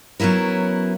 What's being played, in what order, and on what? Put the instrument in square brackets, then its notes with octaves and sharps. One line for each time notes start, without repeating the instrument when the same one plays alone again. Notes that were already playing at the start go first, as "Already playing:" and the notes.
[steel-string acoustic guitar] F#3 B3 C#4 E4 A#4